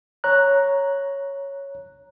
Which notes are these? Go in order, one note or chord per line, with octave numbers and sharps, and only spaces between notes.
C#5 A#5 F#6